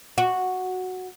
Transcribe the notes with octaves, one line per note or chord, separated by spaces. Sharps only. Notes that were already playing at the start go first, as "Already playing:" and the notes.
F#4